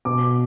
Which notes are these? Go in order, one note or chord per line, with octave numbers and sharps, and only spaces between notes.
B2 D6